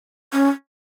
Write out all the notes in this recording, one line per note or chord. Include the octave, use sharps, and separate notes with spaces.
C#4